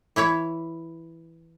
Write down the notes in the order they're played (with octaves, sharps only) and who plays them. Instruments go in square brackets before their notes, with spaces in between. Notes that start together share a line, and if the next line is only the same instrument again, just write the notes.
[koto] E3 E4 C#5 E5